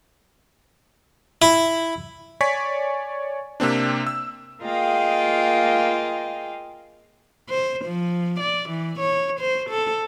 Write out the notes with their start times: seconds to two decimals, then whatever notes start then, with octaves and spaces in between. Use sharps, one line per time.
1.42 E4
2.41 C#5 D5 G#5 C#6 B6
3.60 C3 A#3 C4 D4
4.07 E6
4.63 A#3 F4 G#4 D#5 F5 G5
7.49 C5
7.84 F3
8.40 D5
8.69 E3
8.99 C#5
9.40 C5
9.70 A4